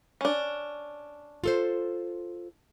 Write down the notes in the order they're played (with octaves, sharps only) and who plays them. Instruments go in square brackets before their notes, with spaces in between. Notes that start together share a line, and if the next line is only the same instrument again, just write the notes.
[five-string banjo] C#4 D4
[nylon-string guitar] F4 A4 C5